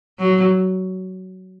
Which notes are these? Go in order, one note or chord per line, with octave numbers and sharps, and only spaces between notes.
F#3